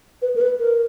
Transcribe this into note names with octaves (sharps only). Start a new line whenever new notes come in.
B4
A#4
B4
A#4